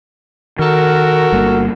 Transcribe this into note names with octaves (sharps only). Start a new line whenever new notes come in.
D#3 F#4 A4 A#4
G1 G3 A#3